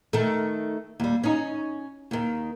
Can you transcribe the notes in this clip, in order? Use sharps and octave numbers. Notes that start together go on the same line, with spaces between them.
D#3 A3
D#2 G3
C#4 D#4
D#2 D#3